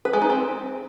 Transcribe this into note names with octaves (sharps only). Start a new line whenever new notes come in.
B4
G#3
D#4
C4